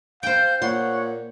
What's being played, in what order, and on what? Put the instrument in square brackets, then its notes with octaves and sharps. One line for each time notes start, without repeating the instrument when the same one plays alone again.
[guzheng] C5 G5 [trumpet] F5 [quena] G6
[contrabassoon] A#2 [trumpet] C#5 [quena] F#5 [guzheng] C6